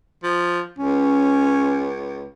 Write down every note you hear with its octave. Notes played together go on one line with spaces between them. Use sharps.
F3
C#2 C#4